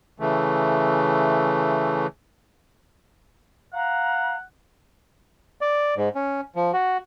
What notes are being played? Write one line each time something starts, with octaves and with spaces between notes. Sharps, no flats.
C#3 E3 A3
F5 F#5 A#5
D5
G#2
C#4
F3
F#4